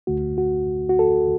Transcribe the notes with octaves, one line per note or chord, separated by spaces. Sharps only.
D2 D3 A3 F#4
F#4
F#4
A4